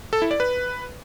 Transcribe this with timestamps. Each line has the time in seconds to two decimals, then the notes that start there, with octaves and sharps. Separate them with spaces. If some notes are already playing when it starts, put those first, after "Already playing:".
0.13 A4
0.22 E4
0.31 D5
0.40 B4